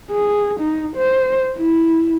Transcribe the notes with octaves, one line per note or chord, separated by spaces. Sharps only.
G#4
D#4
C5
E4